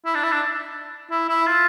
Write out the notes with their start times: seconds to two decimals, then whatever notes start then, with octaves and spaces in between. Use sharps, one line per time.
0.05 E4
0.14 D4
0.23 E4
0.32 D4
1.10 E4
1.29 E4
1.46 F4